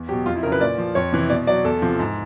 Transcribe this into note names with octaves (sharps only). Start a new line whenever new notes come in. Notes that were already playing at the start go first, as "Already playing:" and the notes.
Already playing: E2
B2 F#3 G4
F2 F4
E4
C#3 F#3 A#4
B4
A#2 D5
F3
F2 C#5
C3 E3
B2 D5
F#3 D5
E2 A4
C3 F3
G#2